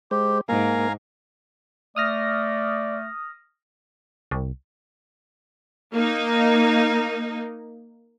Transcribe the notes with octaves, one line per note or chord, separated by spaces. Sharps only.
G#3 G4 C5
G#2 A#3 F5 G#5 A#5
A3 D5 D#6 F6 A#6
C2
A#3 D#4